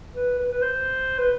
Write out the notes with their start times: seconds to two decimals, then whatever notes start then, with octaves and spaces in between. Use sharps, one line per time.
0.16 B4
0.39 B4
0.52 B4
0.62 C5
1.19 B4